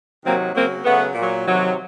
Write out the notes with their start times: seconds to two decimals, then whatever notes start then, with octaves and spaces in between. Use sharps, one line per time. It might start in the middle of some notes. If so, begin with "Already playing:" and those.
0.25 C3 D#3 F#3 A#3 C4
0.55 C#3 F#3 A#3 C4
0.85 C#3 F#3 A3 B3
1.15 A#2 F#3
1.45 C3 D#3 F#3